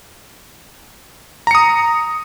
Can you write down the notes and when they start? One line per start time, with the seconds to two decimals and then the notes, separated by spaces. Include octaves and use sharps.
1.47 A#5
1.51 C#7
1.55 D#6